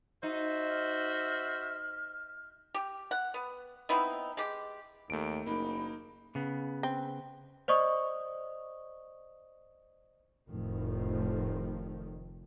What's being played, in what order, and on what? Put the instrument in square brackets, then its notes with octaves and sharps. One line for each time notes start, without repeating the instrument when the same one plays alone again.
[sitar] D#4 [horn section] F#4 C5 E5
[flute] F6
[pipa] G4
F#5
B3
B3 C4 D#4 E4
G#3 G4
[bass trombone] D#2 [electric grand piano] A3 D7
[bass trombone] F#1 [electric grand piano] A#3 D#4 [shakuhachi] B5
[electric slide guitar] C#3 B3
[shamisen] C4
[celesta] C5 D5 D#5 C#6 D#6
[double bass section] F1 A2 D#3 F3